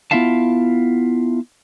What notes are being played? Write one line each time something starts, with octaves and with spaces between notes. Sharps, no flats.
B3 E4 F4 E5 F5 A5